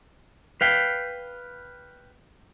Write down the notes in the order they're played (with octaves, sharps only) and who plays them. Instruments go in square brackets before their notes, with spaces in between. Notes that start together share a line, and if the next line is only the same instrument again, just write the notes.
[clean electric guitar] B4 F5 G5